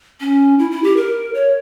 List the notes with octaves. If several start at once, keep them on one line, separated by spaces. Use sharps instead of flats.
C#4
E4
E4
G4
A#4
C#5